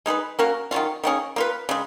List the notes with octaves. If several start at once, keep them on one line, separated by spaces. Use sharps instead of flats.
G#3 D#4 G#4 B4
A#3 C#4 F#4 A#4
D#3 F#3 C#4 F4
D#3 A#3 C#4 G#4
A#3 F4 B4
C#3 G#3